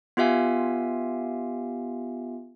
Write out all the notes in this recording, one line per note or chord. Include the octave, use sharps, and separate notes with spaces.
B3 F4 G4 E5 F5 G#5